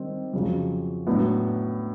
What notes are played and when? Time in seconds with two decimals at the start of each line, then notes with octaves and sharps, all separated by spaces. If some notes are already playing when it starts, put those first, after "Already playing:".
Already playing: D#3 G3 C4
0.33 F2 C#3 F#3
1.07 A2 F#3 B3 D4